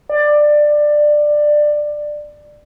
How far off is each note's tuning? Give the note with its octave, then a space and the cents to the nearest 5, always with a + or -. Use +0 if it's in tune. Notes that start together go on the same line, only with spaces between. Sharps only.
D5 +15